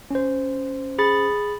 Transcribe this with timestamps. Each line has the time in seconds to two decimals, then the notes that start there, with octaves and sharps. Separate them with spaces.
0.11 C#4 C5
0.98 G#4 B5 A6